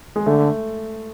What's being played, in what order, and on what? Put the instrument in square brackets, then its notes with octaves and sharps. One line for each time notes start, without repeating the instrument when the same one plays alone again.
[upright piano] G#3
[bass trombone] D3 [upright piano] A3